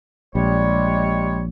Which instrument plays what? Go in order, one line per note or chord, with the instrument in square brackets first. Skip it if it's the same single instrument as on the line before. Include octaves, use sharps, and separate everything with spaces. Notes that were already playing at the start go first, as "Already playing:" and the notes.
[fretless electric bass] A#1 [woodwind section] G3 G#3 C#5